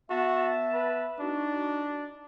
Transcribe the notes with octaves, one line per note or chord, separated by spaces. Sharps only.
B3 F#4 E5 A5
B4
D4 D#4 F#4